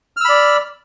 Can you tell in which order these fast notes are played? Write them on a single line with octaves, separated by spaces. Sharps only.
F6 E6 B5 D5